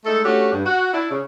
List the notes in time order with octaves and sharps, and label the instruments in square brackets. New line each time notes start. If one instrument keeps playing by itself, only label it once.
[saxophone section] G#3 A3 D#4 A4
A3 C#4 D4 F#4 G4
G2
F#4
D4 E4
C#3